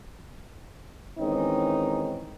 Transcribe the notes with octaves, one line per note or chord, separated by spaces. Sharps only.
D#3 E3 G#3 C4 C#4 D#4